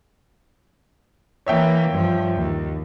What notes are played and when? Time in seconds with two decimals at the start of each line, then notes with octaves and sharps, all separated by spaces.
1.46 E3 A#3 C#5 E5 G5
1.91 G2 F3
2.36 D#2